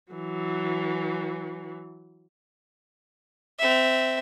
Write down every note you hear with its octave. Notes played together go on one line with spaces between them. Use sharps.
E3 F#3
C4 E5